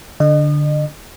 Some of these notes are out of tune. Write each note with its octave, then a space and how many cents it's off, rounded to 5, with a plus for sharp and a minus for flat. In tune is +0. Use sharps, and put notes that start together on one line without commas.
D3 +0 D#5 -35